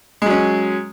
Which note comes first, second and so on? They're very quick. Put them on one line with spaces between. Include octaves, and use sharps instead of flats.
G#3 F#3 C#4